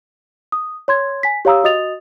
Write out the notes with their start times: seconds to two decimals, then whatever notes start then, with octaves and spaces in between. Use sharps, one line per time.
0.52 D#6
0.88 C#5 C6 G#6
1.23 G#5 B6
1.45 G4 C#5 F5 A#5 D#6 E6
1.64 F#4 D#5 D#6 A6 F7